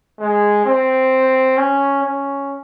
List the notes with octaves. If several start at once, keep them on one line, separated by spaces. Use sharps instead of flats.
G#3
C4
C#4
C#4